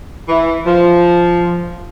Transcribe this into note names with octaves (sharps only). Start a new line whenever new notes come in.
E3
F3